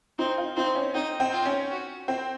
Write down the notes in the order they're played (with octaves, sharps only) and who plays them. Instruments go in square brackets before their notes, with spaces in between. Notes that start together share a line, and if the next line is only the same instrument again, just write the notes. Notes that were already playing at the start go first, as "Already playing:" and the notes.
[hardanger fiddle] C4 [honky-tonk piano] D#4
[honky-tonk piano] F4
[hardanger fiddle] C4 [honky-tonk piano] D#4
[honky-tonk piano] C#4
[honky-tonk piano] C4 [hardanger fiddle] D#4
[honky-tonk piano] C4
[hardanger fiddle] F4
[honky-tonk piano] C#4
[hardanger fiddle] F#4
[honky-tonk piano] C4